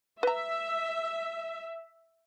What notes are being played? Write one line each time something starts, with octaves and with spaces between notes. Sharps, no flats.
B4 E5 A#5